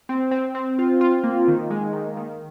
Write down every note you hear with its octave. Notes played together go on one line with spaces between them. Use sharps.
C4
C4
C4
F4
F4
A#3
D#3
G#3
D#3
D#3